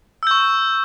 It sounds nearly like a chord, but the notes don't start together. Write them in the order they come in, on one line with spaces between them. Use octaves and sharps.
E6 G6 C#6